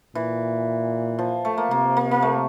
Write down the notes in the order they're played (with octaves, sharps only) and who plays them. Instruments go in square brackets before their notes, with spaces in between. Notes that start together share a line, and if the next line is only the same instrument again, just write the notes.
[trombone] A#2 [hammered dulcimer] E3
[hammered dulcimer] F3
A3
A#3
[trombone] C3 [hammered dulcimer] A#3
[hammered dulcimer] A#3
A#3
A3